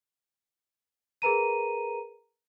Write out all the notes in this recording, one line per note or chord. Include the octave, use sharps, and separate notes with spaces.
G#4 A#4 B4 A#5 D#7